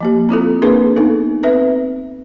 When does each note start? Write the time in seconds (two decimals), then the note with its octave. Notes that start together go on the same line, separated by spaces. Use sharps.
0.01 F3 A#3 G4
0.29 C4 E4 F4 A4
0.62 A#3 C4 D4 G#4 A#4 B4
0.96 B3 D#4 A4
1.43 C4 B4 E5